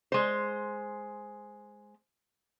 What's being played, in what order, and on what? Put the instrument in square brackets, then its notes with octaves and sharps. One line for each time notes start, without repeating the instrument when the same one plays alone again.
[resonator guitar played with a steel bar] G#3 C5